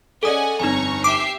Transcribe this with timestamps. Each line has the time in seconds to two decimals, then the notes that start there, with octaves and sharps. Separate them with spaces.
0.23 C#4 G#4 A4 D5 D#5 F#5 G#5 D#6
0.60 G1 F2 D#4 C#5 G#5 A#5 C#6
1.04 G4 E5 D6 C7